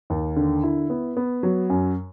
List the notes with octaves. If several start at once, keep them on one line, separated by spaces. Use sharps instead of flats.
D#2
D3
E4
B3
B3
F#3
F#2